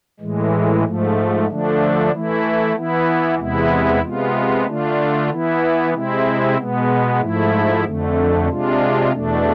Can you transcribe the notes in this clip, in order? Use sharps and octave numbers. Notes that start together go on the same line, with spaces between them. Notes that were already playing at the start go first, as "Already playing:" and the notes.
A2 E3 G#3
G#2 F3 A3
D3 F3 A3 D4
E3 A3 E4
E3 B3 E4
E2 C3 G#3 B3 E4
C3 G#3 B3 F4
D3 A3 D4 F4
E3 B3 E4
C3 G#3 C4 E4
B2 G#3 B3
G#2 F3 A3 E4
F2 D3 A3
C3 G#3 D4 F4
E2 B2 A3 D4